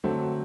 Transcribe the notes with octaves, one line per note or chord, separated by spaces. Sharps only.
D3 F#3 A3 C4